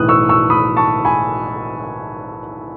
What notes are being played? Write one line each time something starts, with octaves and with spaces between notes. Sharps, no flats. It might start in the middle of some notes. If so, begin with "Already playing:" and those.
Already playing: B1 A2 E3 D#6 F#6
C#6 E6
C#6 E6
B5 D#6
A5 C#6
G#5 B5